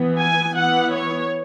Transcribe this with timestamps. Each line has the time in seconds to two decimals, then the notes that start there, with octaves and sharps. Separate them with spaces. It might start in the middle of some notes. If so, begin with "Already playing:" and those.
Already playing: E3 B3
0.20 G#5
0.56 E3 B3 F#5
0.92 C#5